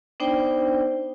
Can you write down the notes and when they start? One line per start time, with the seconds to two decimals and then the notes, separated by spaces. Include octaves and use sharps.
0.20 B3 D4 D#4 C5 D5 G5